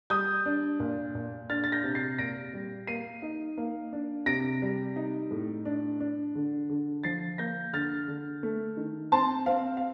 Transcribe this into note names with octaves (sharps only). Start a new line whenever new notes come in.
G3 D#6 G6
D4
A#2
A#2
D4 F6 A6
A6
G6 A#6
C3
A6 C7
A#2 A#6 D7
G3
A#3 C7 D#7
D#4
A#3
D4
C3 A#6 D7
G3
D#4
A2
D4
D4
D3
D3
F3 A6 C7
A#3 G6 A#6
D3 F6 A6
D3
A3
D#3
C4 A5 C6
C4 F5
F5